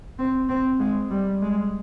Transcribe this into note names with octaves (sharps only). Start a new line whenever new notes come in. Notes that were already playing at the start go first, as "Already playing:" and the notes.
C4
C4
G#3
G3
G#3